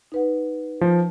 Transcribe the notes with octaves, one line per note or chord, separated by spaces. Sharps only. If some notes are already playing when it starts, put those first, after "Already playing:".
D#4 B4 F#5
F3